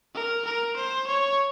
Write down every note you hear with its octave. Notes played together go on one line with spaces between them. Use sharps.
A#4
A#4
C5
C#5